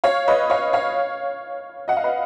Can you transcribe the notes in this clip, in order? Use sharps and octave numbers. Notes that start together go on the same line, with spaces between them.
C#5 F5
B4 D#5
C#5 F5
C#5 F5
D#5 F#5
F5
B4 D#5